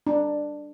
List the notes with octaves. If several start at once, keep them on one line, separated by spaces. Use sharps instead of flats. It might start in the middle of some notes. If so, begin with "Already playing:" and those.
D4